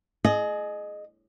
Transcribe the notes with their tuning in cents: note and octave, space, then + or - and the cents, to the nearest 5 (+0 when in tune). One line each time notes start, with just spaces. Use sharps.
G#4 +25 D#5 -20